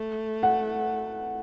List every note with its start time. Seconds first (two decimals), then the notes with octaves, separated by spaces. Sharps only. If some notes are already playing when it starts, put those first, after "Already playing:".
Already playing: A3
0.43 F#5